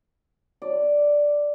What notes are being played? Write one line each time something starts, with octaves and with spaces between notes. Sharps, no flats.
D5